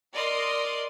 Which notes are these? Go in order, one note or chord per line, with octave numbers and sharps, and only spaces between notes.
A#4 D5 D#5 C6